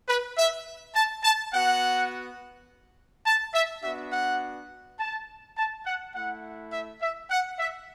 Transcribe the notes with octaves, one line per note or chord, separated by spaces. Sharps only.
B4
E5
A5
A5
B3 F#4 F#5
A5
E5
B3 D4 F#4 E5
F#5
A5
A5
F#5
A3 E4 F#5
E5
E5
F#5
E5